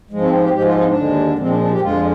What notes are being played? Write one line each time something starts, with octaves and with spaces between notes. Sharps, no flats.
G#2 F3 G#3
C4
G4
G#2 F3 G#3 G4
F4
D#4
C4
D4
D#2 D3 G#3
A#2 F3 G#3 C4
D4
D4
G4
F2 D3 G#3 F4